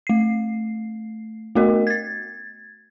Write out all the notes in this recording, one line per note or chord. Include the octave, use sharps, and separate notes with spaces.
A3 C7
A3 B3 F#4 A#4 D#5
G#6 A6